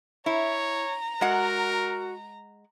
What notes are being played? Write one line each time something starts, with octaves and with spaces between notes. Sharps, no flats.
E4 C#5 A#5
G#3 F#4 A#4 F#5